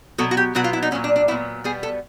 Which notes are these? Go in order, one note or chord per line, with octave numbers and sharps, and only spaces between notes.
B2 F#3 B3 A4
F#4
G4
B2 F#3 B3 F#4
F4
E4
D#4
A#2 F#3 B3 C#4
D4
D4
A#2 F#3 B3 E4
B2 G3 B3 G#4
A4